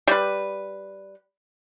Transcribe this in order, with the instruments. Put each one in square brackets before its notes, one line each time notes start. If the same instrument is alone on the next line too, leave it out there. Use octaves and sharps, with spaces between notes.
[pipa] G3 B4